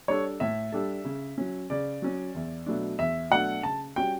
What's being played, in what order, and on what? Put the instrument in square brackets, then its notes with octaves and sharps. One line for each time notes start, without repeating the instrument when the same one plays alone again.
[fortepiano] G3 D4 A4 [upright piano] C#5
[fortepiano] A2 [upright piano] E5
[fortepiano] G3 D4 A4
C#3
F#3 C#4
[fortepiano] C#3 [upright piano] D5
[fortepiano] F#3 C#4
E2
B2 F#3 A3 D4
[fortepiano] E2 [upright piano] E5
[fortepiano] B2 F#3 A3 D4 [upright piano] F#5
[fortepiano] C#3 [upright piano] A5
[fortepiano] G3 C#4 F#4 [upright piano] G5